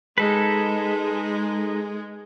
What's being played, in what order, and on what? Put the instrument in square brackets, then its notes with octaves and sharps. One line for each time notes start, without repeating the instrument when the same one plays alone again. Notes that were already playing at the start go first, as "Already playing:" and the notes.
[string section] G#3 [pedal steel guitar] D#4 A4 B4